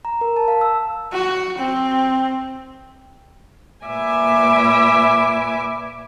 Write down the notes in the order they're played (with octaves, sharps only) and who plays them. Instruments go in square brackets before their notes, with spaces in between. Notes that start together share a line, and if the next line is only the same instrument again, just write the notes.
[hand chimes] A#5
A#4
A5
F5
E6
[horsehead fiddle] F#4
C4
[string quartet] A#2 B4 E5 G#5 D6